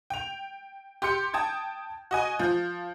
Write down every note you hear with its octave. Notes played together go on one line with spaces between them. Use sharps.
G5 F7
G4 C6 G6 C#7
G5 A5 D#6 G#6
F#4 D#5 G#5
F3 G6